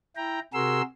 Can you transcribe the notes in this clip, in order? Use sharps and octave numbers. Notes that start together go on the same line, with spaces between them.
E4 G5 A#5
C3 F#4 G#4 A#4 C6 E6